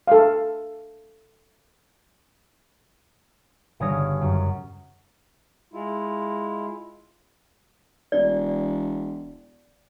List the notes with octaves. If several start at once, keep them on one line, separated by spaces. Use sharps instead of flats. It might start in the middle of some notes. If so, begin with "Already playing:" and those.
A4 F5
G1 C#3 C#5 D#6 F6 A#6
F#2
G#3 E4 F4
E1 D5